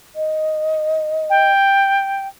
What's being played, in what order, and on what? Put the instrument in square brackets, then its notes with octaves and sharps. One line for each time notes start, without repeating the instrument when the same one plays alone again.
[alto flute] D#5
[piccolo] G5